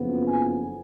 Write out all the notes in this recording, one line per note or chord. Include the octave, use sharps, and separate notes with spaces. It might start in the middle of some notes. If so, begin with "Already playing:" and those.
Already playing: F#1 F2 F3 B3
G#5